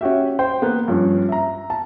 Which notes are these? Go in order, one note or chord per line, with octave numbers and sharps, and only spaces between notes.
C#4 F#4 G4 E5
C5 G5
A#3 B3
G2 F3 C#4
E5 A#5
A5